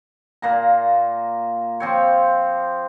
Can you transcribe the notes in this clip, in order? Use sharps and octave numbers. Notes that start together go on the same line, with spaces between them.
A#2 A#3 A#5
F3 C4 C#5